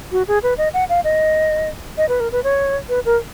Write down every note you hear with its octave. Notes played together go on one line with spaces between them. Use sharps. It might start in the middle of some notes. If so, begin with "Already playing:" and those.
F#4
G#4
B4
D#5
F#5
F5
D#5
D#5
B4
A#4
B4
C#5
B4
A#4